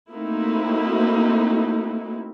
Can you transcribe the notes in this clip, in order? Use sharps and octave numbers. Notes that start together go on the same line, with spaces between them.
A3 A#3 C4 D#4 E4 F#4